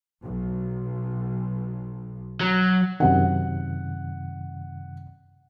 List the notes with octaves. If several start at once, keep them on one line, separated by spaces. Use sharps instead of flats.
B1
F#3
F#2 C3 D#3 F#5